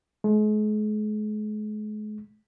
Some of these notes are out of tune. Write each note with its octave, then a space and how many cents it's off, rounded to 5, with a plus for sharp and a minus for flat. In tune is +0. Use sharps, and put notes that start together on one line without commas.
G#3 +40